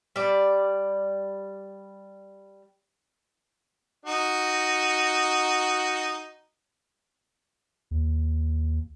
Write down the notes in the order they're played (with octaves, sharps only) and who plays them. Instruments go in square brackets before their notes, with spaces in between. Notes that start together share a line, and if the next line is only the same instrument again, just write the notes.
[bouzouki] G3 D5
[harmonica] D#4 F#4
[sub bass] D#2